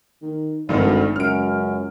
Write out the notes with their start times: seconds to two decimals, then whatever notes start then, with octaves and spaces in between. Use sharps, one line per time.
0.22 D#3
0.69 G#1 D2 G2 D#3 D5
1.16 C#2 F#2 F6 D7